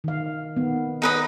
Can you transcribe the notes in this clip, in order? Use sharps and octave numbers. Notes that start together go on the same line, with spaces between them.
D#3 F5
D#3 B3
D#4 B4 D#5